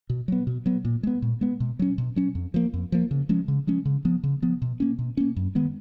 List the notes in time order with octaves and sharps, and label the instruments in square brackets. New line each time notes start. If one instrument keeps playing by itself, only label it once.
[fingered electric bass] B2
F#3 B3
B2
F#3 B3
A#2
G#3 B3
A#2
G#3 B3
B2
F#3 C#4
B2
F#3 C#4
F2
F3 A#3
F2
F3 A#3
C#3
F3 G#3 C#4
C#3
F3 G#3 C#4
C#3
F3 B3
C#3
F3 B3
B2
A#3 C#4
B2
A#3 C#4
F#2
D#3 G#3 B3